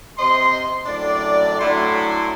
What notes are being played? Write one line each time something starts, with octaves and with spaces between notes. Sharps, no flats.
C3 C5 D#5 C6
F#2 A2 D4 D5
A2 F#3 A3 D4 E4 C6